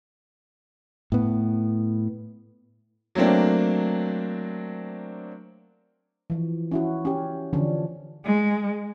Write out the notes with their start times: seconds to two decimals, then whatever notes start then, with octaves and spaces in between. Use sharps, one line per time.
1.12 A2 B3
3.15 F#3 A3 A#3 C4 D4
6.30 E3 F3
6.71 C#4 E4 F#4
7.05 C#4 G4
7.53 D3 E3 F3 C#4 D4
8.25 G#3